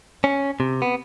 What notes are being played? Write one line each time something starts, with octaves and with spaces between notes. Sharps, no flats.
C#4
C3
B3